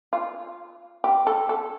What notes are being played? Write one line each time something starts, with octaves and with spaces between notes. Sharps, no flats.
F4
G4
A4
A4